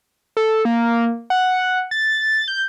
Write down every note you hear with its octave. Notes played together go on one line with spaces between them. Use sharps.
A4
A#3
F#5
A6
G6